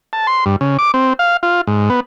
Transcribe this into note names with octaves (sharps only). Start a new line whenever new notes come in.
A5
C6
G2
C#3
D6
C4
F5
F4
G#2
B3